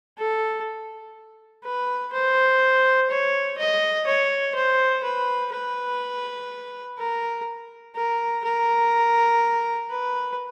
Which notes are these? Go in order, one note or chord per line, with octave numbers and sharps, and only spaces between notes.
A4
B4
C5
C#5
D#5
C#5
C5
B4
B4
A#4
A#4
A#4
B4